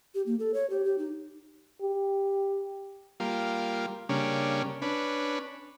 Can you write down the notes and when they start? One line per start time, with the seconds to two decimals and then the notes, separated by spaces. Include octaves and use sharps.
0.15 G4
0.26 A#3
0.40 A4
0.54 C#5
0.70 G4
0.84 G4
0.98 D#4
1.82 G4
3.20 G3 A#3 F4
4.09 C#3 G3 A#3 C#4 D4
4.82 C#4 D4 B4